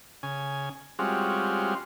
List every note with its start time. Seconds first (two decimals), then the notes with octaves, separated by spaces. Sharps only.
0.23 C#3 G#5
0.99 G3 G#3 C4 C#4 F4 F#4